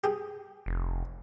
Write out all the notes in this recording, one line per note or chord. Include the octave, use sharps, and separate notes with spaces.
G4 G#4
F1